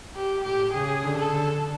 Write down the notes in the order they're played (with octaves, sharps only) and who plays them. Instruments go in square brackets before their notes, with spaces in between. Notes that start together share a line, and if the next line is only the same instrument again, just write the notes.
[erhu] G4
[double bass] A2 [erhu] G4
[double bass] C#3 [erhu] G#4
[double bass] D3
[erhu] A4
[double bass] D3